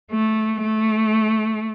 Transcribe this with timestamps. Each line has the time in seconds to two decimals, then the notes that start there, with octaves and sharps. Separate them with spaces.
0.11 A3
0.63 A3